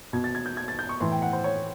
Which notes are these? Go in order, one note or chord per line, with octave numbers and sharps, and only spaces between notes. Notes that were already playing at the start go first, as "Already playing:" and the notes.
B2 G#6
A6
G#6
G6
G#6
A6
G6
C#6
A2 E3 C6
G5
F#5
C5
C#5